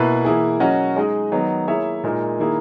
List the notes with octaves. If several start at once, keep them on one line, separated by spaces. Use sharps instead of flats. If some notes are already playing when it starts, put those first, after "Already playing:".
Already playing: B2 A#3 E4 B4
E3 A#3 E4 G#4
F#3 C#4 F#4 A#4 D#5
G#3 D#4 G#4 D#5
D#3 F#3 B3 D#4
A#3 E4 G#4 C#5 E5
A#2 G#3 D#4 A#4
D#3 A#3 E4 G#4